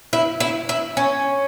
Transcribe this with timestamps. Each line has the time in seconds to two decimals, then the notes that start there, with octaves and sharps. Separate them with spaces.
0.13 E4
0.40 E4
0.69 E4
0.97 C#4